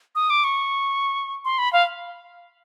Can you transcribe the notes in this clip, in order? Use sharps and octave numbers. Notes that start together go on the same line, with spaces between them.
D#6
D6
C#6
C6
B5
F5